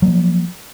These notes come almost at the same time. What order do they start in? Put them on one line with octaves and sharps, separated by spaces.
F#3 A#3 F3